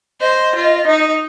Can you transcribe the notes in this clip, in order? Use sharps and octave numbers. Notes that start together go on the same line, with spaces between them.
C5 D#5
F4
D#4